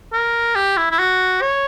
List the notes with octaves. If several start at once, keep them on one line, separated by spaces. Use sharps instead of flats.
A#4
G4
E4
E4
F#4
C#5